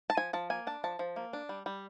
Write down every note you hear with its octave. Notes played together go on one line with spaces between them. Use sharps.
A5
F3 G#5
F3 A5
A#3 G#5
D4 A5
F3 A5
F3
A#3
D4
G3
G3